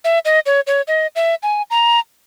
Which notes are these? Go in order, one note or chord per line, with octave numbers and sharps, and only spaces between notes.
E5
D#5
C#5
C#5
D#5
E5
G#5
A#5